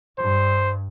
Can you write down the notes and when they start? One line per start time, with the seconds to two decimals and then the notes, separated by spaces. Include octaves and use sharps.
0.18 G2 C5